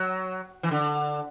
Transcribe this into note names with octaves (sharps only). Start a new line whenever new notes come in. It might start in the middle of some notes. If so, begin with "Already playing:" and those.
Already playing: F#3
E3
D3